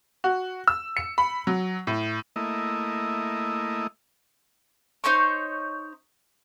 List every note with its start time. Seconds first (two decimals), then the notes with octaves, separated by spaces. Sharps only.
0.24 F#4
0.68 E6
0.97 C#7
1.18 B5
1.47 F#3
1.87 A2
2.36 A3 A#3 E4 D#5
5.04 D#4 C5 C#5 C#6